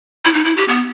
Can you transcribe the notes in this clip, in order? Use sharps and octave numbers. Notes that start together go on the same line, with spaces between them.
E4
D#4
E4
G4
B3